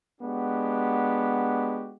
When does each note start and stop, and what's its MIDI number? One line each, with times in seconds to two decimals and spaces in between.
0.21 1.95 56
0.21 1.95 59
0.21 1.95 62
0.21 1.95 66
0.21 1.95 67